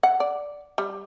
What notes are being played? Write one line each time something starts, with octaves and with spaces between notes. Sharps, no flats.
F#5
D5
G3